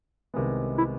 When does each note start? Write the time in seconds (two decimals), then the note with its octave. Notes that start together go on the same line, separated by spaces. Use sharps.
0.34 C2 C3 D#3 G#3 B3
0.78 E4